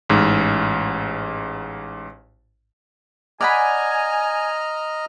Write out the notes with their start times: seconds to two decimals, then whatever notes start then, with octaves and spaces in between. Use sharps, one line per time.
0.09 A1 G#2
3.41 D5 D#5 F#5 G#5 A#5 B5 F6